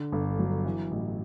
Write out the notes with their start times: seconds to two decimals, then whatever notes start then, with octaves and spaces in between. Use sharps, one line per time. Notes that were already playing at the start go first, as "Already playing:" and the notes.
Already playing: D3
0.12 G1
0.39 F#3
0.65 E3
0.91 A1